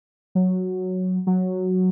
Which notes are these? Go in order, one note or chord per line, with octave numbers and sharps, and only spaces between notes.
F#3
F#3